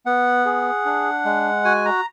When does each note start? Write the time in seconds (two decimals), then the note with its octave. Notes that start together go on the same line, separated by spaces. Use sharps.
0.06 B3 F#5
0.45 G#4
0.85 D4
1.25 G#3
1.65 F#4 G#5
1.85 A#5